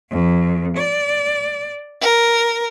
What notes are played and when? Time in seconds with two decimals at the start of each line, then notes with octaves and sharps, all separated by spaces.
0.11 F2
0.77 D5
2.01 A#4